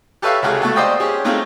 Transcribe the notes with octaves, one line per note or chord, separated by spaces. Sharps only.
G4 A4 B4 C#5 E5 F5
C#2 C3 F4 F#4 G#4 A4
A3 F#4 A4
C5 D5 D#5 F5 G5
C#4 G4 G#4
G#3 A3 C4 D#4 F4